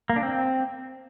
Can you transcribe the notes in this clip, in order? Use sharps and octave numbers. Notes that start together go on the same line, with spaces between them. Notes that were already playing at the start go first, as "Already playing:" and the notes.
A#3
D4
C4